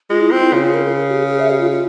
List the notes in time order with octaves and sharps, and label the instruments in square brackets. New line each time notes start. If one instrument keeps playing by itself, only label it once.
[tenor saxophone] G#3 [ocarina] F4
[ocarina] E4
[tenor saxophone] C4 [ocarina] F4
[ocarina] E4
[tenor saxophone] C#3 [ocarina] F4
[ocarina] G#4
A#4
A#4
G#4
G4
G#4
E5
G4
F4
F4